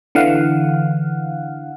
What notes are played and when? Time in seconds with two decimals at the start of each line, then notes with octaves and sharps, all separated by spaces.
0.15 D3 E3 F5 F#5